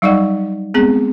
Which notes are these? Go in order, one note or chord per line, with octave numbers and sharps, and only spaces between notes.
F#3 G3 D#4 D5 D#5 F#5
G#3 B3 C4 G#4